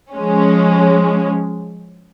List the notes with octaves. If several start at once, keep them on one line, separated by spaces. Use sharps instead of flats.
F3 G#3 C#4